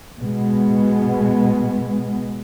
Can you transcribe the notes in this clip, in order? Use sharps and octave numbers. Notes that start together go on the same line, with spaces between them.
B2 G#3 B3